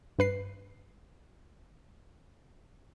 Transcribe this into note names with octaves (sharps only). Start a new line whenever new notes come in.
G2 B4 C7